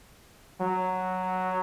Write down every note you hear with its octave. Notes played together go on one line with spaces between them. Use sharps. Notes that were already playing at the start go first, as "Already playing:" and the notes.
F#3